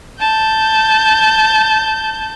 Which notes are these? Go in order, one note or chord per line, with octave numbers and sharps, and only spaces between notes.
A5 G6